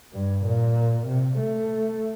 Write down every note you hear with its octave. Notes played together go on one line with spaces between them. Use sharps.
G2
A#2
C3
A3